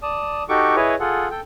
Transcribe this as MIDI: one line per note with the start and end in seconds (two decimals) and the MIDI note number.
0.02 0.43 74
0.02 0.43 81
0.02 0.43 87
0.49 0.75 63
0.49 0.75 66
0.49 0.75 67
0.49 0.75 69
0.49 0.75 85
0.49 0.75 86
0.76 0.95 64
0.76 0.95 68
0.76 0.95 71
0.76 0.95 73
0.76 0.95 75
1.00 1.28 65
1.00 1.28 68
1.00 1.28 69
1.00 1.28 78
1.31 1.41 69
1.31 1.41 79